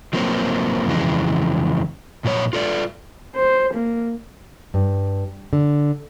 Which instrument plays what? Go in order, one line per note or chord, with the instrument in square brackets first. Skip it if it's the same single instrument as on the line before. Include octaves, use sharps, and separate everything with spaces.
[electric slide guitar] F3 F#3 A#3 C4
F2 C#3 E3 G#3
A#2 F3 F#3 B4 C#5
F4 A4 D5
[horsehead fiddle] C5
A#3
[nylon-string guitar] G2
D3